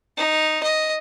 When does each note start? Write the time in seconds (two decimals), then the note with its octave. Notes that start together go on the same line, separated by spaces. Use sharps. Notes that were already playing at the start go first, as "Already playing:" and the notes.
0.17 D#4
0.63 D#5